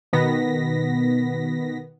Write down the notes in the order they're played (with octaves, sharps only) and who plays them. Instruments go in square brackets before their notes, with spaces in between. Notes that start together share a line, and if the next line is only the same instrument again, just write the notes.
[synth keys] B2 D#3 B3 A#6 B6